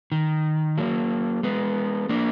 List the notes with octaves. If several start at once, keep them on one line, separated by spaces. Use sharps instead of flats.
D#3
F#3 A#3
G#3 B3
A#3 D4